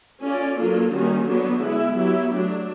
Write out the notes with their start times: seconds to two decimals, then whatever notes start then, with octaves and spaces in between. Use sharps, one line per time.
0.22 C#4 F4 A4 D5
0.57 F#3 A#3 D4 F4 A4
0.92 D#3 G3 A#3 C#4 F#4
1.27 D3 F#3 B3 D4 F#4
1.62 G#3 B3 E4
1.97 F#3 B3 E4 G4
2.32 F#3 A3 D4